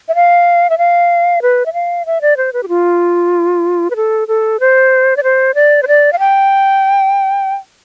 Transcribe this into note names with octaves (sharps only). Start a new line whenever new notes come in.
E5
F5
E5
F5
B4
E5
F5
E5
D5
C5
B4
G4
F4
B4
A4
A4
C5
D5
C5
D5
C5
D5
F5
G5